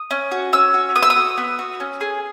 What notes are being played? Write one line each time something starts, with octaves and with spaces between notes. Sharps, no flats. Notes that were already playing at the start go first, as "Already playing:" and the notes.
Already playing: D#6
C#4
F#4
C#4 E6
F#4
B3 D#6
E6
D#6
F#4
B3
F#4
C#4
G#4